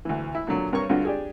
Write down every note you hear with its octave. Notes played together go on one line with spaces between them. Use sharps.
D2 E3
E4
A#2 D3 F#3
G2 A#4 C#5 C#6
G2 D3 F4 F#4
D4 G4 G#4